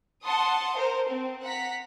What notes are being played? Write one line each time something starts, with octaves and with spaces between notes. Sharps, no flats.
F#5 A5 C6 D#6
A#4 C5
C4
F#5 A#5 B6